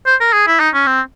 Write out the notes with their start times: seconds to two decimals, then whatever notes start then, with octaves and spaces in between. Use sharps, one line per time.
0.06 C5
0.20 A#4
0.33 G#4
0.47 E4
0.60 D#4
0.74 C#4
0.87 C4